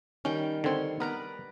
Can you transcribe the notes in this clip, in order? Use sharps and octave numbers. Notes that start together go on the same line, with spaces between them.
D#3 G3 C#4 G5
D3 C4 C#5 C6
B3 A#4 B4 D5 A#5